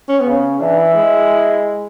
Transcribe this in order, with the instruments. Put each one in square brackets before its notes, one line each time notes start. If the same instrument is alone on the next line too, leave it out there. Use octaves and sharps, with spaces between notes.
[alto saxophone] C#4
B3
[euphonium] C#3
[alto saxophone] C#4
[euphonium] E3 [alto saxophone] D4
[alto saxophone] E4
[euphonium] G#3